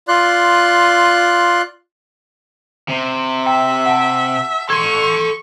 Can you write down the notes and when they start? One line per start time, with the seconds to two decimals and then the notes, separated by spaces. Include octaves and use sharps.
0.08 F4 D5 C6 F#6
2.89 C3
3.45 E5 G5 A#5
3.86 F#5 A5
4.70 A4 C6 C#6 G#6